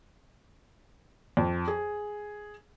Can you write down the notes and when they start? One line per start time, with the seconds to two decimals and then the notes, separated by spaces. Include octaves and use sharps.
1.37 F2
1.68 G#4